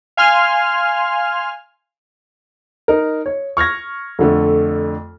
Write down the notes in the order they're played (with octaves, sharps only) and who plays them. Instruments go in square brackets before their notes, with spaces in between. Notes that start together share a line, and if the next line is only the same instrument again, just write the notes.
[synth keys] F5 G#5 C6 F6
[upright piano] D#4 A#4
C#5
C#6 F6 G#6 A#6
F2 D3 A3